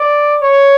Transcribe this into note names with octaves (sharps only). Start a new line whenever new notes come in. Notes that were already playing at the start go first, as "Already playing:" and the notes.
Already playing: D5
C#5